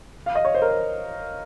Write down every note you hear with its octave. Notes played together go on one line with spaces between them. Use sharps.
F5
D#5
C#5
C5
A#4
C5